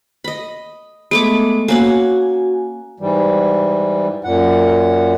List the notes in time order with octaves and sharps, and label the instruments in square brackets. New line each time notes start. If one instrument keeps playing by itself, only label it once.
[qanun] D#5 B5
[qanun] G#3 A3 D6 [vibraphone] B3
[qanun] A#3 C#4 F#5 [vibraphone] F#4 G#5
[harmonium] G#2 E3 G3
F#2 A#2 F#5